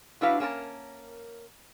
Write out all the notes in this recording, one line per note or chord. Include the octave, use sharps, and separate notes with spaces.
F#3 D4 E4 F#4 B4 F5
A#3 C#4 A#4 B4 A5